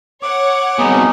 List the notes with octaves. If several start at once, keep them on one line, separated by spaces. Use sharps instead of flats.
C#5 F#5 D6
C2 B2 D#4 G#4